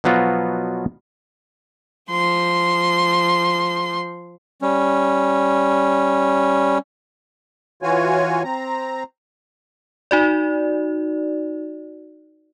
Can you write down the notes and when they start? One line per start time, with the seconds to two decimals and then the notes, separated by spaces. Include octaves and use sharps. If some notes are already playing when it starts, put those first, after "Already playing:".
0.04 B2 F3 F#3 B3 F4 F#4
2.11 F3 C6
4.62 G3 C#4
7.83 E3 F4 F#4 C#5 G#5
8.44 C4 A#5
10.11 D#4 F#4 D5